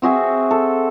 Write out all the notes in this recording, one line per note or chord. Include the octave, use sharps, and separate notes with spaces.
C4 F#4 G#4 E5
A4